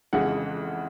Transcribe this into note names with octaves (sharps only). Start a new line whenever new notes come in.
F2 C#3 E3 G#3 F#5